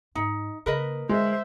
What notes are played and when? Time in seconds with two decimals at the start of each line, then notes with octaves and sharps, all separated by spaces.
0.15 G#2 D#4
0.66 C#3 A#3 A#4 B4 D#5
1.09 D3 G#3 C5 E5